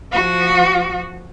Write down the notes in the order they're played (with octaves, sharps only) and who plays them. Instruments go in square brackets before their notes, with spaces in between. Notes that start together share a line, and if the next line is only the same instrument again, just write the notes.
[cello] F3 F#4